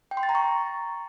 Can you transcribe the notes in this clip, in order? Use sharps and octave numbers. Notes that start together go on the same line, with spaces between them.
G5
C6
A6
A#5
C#6